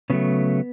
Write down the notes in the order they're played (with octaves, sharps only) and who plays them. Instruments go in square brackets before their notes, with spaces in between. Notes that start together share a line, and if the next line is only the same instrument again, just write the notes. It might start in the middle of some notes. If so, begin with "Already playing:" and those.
[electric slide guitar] C#3 F#3 A3 B3